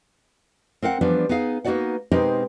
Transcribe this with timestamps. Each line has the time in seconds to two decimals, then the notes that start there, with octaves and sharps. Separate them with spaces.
0.82 C4 A#4 F5 F#5
1.01 E3 F3 G3 B3 D4
1.29 B3 D#4 G#4 F5
1.64 A#3 B3 D#4 F#4 D5 F#5
2.11 B2 G#3 C4 D#4 G4 A#4